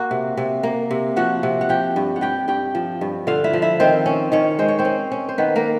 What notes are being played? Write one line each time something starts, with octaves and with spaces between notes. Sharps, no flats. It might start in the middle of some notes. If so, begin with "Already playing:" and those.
Already playing: A#3 F#4 F#5
C3
C3
A#3
C3
F3 F#4 F#5
C3
F#5
F3 G4 G5
G2
F#5
G2 G4 G5
G2 G4 G5
F3
G2
D3 F4 F5
E4 E5
F3
E4 E5
D#3 C4 C5
C#4
D#3 C#4 C#5
G#3 C5
C#5
C4 C5
C#4
C#4
C5
D#3 B3 B4
A#3 A#4